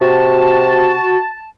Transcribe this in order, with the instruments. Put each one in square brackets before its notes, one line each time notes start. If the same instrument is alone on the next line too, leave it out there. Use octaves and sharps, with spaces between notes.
[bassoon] C3 [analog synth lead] F#4 [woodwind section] A5